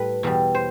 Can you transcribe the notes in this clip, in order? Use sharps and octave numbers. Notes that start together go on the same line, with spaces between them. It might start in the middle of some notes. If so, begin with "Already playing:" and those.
Already playing: A2 G3 A4 B4
E2 B2 G3
C5